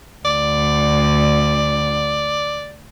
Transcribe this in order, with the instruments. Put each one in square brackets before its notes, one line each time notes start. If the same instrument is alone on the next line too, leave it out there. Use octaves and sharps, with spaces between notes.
[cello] D2 [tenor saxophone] D5